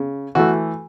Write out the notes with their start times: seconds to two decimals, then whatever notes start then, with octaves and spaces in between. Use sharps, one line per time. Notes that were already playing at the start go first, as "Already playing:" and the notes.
Already playing: C#3
0.35 E3 A3 F#4